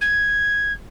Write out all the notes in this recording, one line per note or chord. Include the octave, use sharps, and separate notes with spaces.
G#6